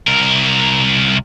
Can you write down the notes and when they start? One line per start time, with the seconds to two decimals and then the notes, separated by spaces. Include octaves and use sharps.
0.07 C2 A#4